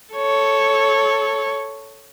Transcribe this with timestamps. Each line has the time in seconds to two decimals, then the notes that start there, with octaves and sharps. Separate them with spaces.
0.15 A4 C#5